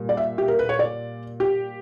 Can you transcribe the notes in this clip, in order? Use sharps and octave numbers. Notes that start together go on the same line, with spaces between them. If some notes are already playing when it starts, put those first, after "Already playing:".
Already playing: A#2 G3
D5
E5
G4
A#4
B4
C#5
D5
G4